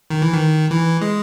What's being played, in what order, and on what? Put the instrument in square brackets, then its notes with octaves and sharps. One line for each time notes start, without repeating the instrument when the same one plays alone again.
[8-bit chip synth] D#3
E3
D#3
E3
G#3